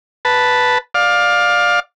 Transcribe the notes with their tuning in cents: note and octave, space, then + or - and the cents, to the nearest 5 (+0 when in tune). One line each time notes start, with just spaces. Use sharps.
B4 +0 A5 +0
D5 +10 F5 +20